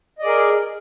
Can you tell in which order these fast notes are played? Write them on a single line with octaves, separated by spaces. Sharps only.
D#5 D5 G#4 A#4